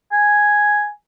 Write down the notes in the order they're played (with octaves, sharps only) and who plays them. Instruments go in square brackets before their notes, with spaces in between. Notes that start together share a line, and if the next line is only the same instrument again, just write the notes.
[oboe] G#5